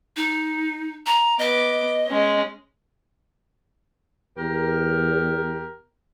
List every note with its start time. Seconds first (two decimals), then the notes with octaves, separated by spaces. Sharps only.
0.16 D#4
1.06 A#5
1.39 B3 D#5 D6
2.08 G#3 C#4
4.38 E2 G4 A#4